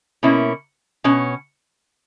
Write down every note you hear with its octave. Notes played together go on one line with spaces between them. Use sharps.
B2 A#3 C#4 E4
B2 C#4